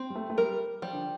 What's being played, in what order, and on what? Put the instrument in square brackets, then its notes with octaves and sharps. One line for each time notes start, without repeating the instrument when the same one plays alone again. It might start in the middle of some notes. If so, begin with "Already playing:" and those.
Already playing: [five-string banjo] C4
[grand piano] G3
A3
A3
[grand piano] G3 [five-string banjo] A#4
[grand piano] F3 [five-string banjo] G3
[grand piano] D3